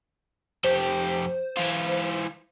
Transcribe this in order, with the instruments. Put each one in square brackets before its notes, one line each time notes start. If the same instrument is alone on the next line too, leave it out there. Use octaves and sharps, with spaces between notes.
[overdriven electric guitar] F2 G4 [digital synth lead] C5
[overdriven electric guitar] E3 F4